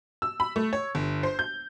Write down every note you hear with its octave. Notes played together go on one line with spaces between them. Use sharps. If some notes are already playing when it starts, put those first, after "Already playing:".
E6
B5
A3
C#5
G1
C5
G6